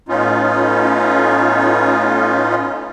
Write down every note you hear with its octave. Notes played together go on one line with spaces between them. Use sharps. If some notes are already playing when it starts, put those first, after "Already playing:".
A2 B3 C#4 D#4 F4